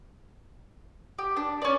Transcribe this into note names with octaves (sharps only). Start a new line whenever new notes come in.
G4
D4
C#4 D5